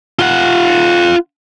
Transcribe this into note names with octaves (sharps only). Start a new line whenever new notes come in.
F4 F#5